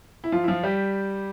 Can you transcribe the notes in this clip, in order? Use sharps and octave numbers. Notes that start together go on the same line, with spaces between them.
E4
F3 F4
E4
F3 F4
G3 G4